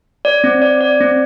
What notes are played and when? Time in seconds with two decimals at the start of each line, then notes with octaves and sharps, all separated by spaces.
0.25 D5
0.44 C4
0.62 D5
0.81 D5
1.00 C4